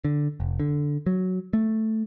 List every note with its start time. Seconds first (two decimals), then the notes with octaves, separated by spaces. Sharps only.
0.05 D3
0.40 F1
0.60 D3
1.06 F#3
1.53 A3